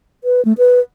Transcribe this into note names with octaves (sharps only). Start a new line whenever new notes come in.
B4
A3
B4